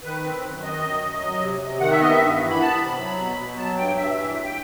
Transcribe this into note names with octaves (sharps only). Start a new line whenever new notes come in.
D#3 B4
C4
F#2
D#3 D#5
F#2
F#2
F#3
C3
C3
D#3 F#5
E5
B3 D#5
E5
G2
E3
B5
B3 A5
B5
C3
F#3
B2
B2
F#3 A5
G2 G5
G2 E5
E3 E5
G2
G5